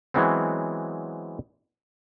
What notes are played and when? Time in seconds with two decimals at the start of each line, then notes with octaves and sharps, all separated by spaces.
0.14 E3 F#3 G#3 B3 C4